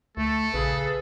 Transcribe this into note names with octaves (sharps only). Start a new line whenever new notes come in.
D2 A3 A4
A#1 C#3 G#4 B4